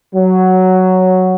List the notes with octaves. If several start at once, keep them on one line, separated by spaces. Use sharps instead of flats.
F#3